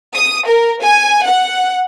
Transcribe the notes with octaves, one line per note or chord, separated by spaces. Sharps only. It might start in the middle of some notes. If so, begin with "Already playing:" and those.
D#6
A#4
G#5
F#5